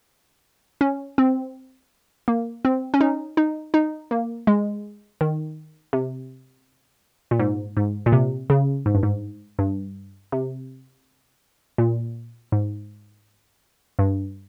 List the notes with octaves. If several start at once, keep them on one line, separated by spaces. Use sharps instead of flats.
C#4
C4
A#3
C4
C#4
D#4
D#4
D#4
A#3
G#3
D#3
C3
A#2
G#2
G#2
A#2
C3
C#3
G#2
G2
G#2
G2
C3
A#2
G#2
G2